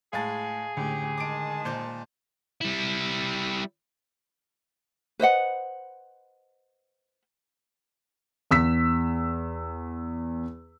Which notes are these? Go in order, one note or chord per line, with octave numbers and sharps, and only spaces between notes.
A2 G#3 G#4 F5 A5 A6
C#2 A2 D3 G4
D#3 G#3 A5 D6 D7
A#2 C5 G6
G3 E4
B4 C5 D#5 F#5
E2 E6 B6